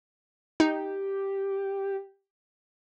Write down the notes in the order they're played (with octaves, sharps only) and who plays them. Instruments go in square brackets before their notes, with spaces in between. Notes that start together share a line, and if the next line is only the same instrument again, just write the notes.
[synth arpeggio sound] D#4 [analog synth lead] G4